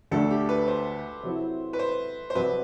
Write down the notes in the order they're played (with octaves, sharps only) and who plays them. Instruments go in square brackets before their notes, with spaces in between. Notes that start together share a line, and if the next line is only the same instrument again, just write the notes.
[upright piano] D2 D3 A3 D4 [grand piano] A4
[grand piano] G4
B4
C5
[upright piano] C3 F#3 C4 E4
[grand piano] B4
C5
C5
[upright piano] C2 C3 F#3 C4 [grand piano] B4